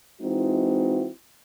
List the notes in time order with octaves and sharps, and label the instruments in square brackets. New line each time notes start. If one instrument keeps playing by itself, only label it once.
[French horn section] E3 G#3 C4 D#4 E4 F#4